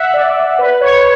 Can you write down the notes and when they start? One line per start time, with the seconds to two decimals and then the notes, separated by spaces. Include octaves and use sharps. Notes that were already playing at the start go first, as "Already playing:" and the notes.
Already playing: E5 F#5
0.14 D5
0.59 B4
0.81 C#5